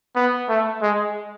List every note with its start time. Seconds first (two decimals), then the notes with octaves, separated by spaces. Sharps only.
0.16 B3
0.49 A3
0.82 G#3